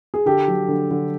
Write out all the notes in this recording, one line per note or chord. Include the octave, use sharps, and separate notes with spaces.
G#4
D3 G4 A4
F#3
D3
D3